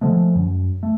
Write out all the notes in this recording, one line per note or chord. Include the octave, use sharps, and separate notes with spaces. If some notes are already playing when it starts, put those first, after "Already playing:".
D3 F3 G#3 A3
F#2
A3